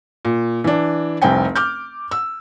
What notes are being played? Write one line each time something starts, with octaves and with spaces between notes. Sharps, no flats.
A#2
E3 D4
F1 C2 C4 G5 G#5
D6 F6 G6
E6